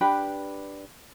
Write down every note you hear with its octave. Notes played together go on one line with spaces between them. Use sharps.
D4 G4 B4 B5